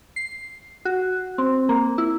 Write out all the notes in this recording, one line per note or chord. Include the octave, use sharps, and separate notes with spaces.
C7
F#4
C4
A#3
E4